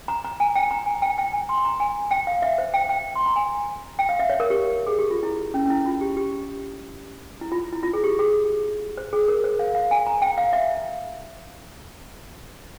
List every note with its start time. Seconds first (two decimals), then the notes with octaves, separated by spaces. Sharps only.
0.08 A#5
0.25 A#5
0.40 G#5
0.55 G5
0.71 A#5
0.86 G#5
1.02 G5
1.18 G5
1.33 G#5
1.49 C6
1.65 A#5
1.80 G#5
2.11 G5
2.27 F5
2.42 E5
2.58 C5
2.74 G5
2.89 G5
3.16 C6
3.26 A#5
3.36 G#5
3.99 G5
4.09 F5
4.19 E5
4.30 C#5
4.40 A#4
4.50 G4
4.87 G#4
4.99 G4
5.11 F4
5.23 E4
5.54 C#4
5.66 C#4
5.70 E4
5.86 F4
6.01 G4
6.17 G4
7.41 E4
7.52 F4
7.73 E4
7.83 F4
7.93 G#4
8.04 G4
8.19 G#4
8.98 C5
9.13 G#4
9.28 A#4
9.44 C5
9.59 F5
9.75 F5
9.91 G#5
10.07 A#5
10.22 G5
10.38 F5
10.53 E5